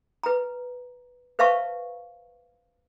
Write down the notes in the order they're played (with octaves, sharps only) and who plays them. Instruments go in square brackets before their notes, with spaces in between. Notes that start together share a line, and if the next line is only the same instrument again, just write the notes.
[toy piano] B4 A#5
B4 C5 E5 F5 A5 C#6